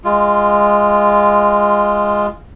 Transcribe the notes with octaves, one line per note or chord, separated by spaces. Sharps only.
G#3 F4